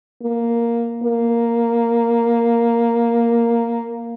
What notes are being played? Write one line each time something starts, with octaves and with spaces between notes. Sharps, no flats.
A#3
A#3